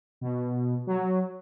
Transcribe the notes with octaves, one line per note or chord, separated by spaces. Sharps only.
B2
F#3